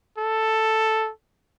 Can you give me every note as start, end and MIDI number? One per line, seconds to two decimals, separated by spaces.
0.18 1.10 69